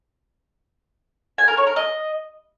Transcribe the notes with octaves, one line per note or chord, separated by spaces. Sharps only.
G#5
A#4
C#5
A#4
D#5